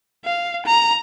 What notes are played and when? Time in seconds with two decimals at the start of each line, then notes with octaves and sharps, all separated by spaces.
0.25 F5
0.66 A#5